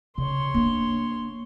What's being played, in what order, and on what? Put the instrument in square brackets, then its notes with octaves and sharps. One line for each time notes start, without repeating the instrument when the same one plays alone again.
[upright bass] C#3 [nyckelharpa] C#5 C6
[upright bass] A#3 D4